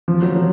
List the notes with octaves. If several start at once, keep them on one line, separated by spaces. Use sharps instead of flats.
F3
F#3
F#3